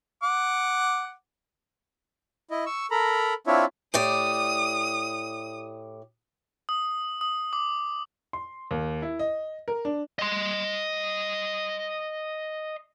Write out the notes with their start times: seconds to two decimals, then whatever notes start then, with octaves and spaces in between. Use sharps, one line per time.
0.23 F#5 D6
2.51 E4 D#5
2.66 C#6 E6
2.91 A4 A#4 A#5 B5
3.47 C4 D4 E4 F4 C#5 E5
3.94 A2 G4 D5 D#6
6.69 D#6
7.21 D#6
7.53 D6
8.33 C6
8.71 D#2
9.02 E4
9.19 D#5
9.68 A#4
9.85 D4
10.19 D#5 C6